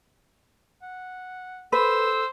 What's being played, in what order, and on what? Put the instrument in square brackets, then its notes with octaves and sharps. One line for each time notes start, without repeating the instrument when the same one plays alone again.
[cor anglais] F#5
[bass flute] A4 [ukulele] B4 [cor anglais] C5 [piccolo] E6